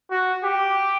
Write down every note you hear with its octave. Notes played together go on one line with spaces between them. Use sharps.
F#4
G4